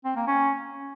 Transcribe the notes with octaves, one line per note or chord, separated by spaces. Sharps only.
C4
A#3
C#4